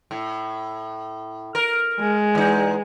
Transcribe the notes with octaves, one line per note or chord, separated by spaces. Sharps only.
A2
A#4
G#3
E2 D#4